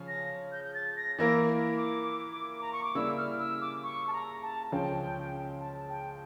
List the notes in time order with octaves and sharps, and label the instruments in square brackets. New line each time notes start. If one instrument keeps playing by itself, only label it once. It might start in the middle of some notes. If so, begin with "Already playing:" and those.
Already playing: [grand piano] C#3 F3 C#4
[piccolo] A#6
G6
G6
A6
A#6
[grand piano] E3 A#3 E4 A#4 [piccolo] A#6
[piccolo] D6
A#5
C#6
D6
[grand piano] C#3 G3 A#3 E4 [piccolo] E6
[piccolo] F6
E6
D6
C#6
A5
A#5
A5
[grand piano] C#2 C#3 F3 C#4 [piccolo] G5
[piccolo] A5
G5